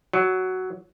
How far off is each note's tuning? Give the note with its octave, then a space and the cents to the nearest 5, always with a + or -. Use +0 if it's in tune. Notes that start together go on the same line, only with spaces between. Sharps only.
F#3 +5